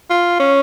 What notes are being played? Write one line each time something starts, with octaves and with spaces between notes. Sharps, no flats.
F4
C#4